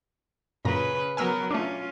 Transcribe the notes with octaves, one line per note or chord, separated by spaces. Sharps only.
F#2 A#2 C#3 B4 A#5
F#3 B3 A#4 G#5 E6 F6
A3 C#4 D4 F4